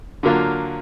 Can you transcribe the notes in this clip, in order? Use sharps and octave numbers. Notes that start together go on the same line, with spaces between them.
D3 F#3 A#3 F4